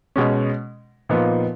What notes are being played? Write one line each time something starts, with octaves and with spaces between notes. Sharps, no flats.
B2 G#3 C#4
A#2 F3 B3 D#4